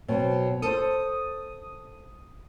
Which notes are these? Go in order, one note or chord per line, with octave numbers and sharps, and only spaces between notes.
B2 F#3 C4
A4 C5 D#6